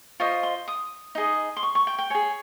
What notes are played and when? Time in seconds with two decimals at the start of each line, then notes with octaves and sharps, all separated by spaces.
0.20 F4 C5 D#5 C#6
0.43 C6
0.68 D#6
1.15 D#4 G#4 D#5
1.57 C6
1.63 C#6
1.75 C#6
1.87 G5
1.98 G5
2.10 G#4 C#5 G#5